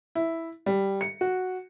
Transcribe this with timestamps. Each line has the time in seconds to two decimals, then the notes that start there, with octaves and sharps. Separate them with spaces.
0.15 E4
0.66 G3
1.01 C#7
1.21 F#4